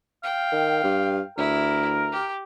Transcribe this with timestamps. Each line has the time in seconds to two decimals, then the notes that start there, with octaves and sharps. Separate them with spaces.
0.24 F5 G5
0.52 D#3
0.84 G2
1.38 D2 E4 A#4
2.12 G4